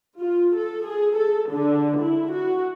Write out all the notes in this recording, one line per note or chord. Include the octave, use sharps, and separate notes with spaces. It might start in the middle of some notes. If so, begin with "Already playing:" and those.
F4
A4
G#4
A4
D3
E4
F#4